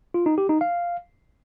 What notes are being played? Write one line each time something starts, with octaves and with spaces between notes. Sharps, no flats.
F4
D#4
G4
D#4
F5